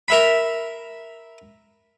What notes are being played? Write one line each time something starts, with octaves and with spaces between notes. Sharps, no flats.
A#4 E5 B5